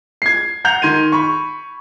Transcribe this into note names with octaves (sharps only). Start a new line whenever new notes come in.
G#6 C7
F#5 A#5 G6 F7
D#3 C6 G#6 D#7
B5 C#6